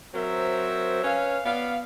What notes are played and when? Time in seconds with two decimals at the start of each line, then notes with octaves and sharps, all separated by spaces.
0.14 F#3 C4 A#4 C5 E5
1.04 C#4 B4 C#5 F5
1.45 B3 D5 F5